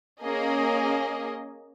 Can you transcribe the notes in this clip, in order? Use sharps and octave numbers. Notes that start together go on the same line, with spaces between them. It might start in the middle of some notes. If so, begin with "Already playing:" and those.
A#3 C#4 G#4 D#5 G#5